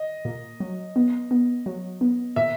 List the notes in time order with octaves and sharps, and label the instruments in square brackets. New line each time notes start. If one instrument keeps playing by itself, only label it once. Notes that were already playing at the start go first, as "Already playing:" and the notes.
Already playing: [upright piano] D#5
[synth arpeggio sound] A#2
F#3
B3
B3
F#3
B3
[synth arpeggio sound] A#2 [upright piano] E5